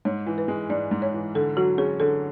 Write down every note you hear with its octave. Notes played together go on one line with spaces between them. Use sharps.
G#2 C#5
E3
B4
G#3
G#2 D5
G#2
C#5
E3
D3 A4
F#3 F#4
C#4 G#4
D3 A4